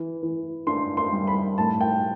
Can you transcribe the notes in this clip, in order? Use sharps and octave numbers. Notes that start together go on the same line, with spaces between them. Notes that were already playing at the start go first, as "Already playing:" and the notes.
Already playing: E3
E3
D4 C6
C6
G3
B5
A2 A5
G5